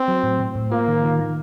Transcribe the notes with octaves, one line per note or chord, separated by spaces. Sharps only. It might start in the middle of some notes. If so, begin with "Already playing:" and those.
Already playing: C4
F#3
A2
A2
A2
A#3 F4
D#3
D#3
D#3